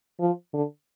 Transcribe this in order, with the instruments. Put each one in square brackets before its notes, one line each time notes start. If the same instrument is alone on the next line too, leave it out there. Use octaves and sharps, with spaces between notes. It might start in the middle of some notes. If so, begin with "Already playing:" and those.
[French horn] F3
D3